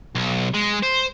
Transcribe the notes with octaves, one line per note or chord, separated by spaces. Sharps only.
B1
G#3
C5